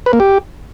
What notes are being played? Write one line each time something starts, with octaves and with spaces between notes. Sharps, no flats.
B4
A#3
G4